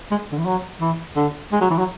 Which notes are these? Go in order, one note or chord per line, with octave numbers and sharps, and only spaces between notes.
G#3
D3
E3
F#3
E3
D3
G#3
F#3
E3
F#3